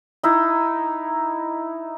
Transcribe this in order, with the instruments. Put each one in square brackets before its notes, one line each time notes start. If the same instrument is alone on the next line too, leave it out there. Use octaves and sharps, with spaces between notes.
[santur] D#4 E4 D#5